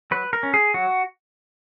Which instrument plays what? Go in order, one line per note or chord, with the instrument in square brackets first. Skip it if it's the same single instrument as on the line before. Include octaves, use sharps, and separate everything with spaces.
[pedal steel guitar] F#3 B4
A#4
C#4
G#4
F#3 F#4